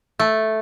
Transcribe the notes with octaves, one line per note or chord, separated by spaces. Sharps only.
A3